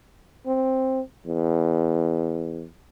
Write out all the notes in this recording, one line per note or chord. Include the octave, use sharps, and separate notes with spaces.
C4
E2